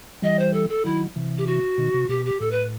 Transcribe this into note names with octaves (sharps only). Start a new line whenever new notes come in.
E3 G3 D#5
C5
A4
A4
D#3 F#3 E4
C3 E3
G4
F#4
B2 D#3
C3
B2 G4
G4
A2 A4
B4